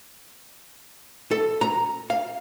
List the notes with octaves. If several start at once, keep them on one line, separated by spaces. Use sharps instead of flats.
A4
A#5
F5